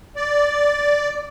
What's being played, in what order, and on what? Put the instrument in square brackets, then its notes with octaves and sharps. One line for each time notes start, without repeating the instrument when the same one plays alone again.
[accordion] D5